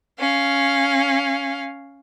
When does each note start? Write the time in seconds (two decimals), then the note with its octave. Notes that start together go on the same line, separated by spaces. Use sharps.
0.19 C#4 F5